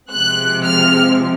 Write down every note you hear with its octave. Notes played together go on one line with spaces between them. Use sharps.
C3 F3 G#3 C4 F#6
F6